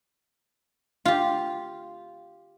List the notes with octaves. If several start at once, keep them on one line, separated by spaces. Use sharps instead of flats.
F4 G4